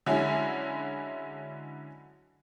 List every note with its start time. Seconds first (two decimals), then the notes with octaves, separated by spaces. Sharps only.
0.06 D3 F#3 G#3 C#4 E4